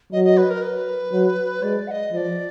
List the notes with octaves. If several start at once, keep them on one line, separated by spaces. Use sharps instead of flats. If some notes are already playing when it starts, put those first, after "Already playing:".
F#3 D#5
D#5
B4
A#4
B4
F#3
G#3 D5
F#5
D#5
F3 D5 D#5